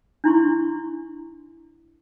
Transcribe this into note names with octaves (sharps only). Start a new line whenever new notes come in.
D4 E4 C6 C#6